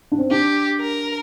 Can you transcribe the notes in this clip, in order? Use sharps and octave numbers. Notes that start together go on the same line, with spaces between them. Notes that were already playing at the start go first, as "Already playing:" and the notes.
D4
C4
D4 G4
A#4